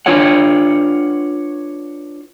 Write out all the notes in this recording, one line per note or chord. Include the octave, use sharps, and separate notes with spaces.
D4 F4 B4 C#5 F#5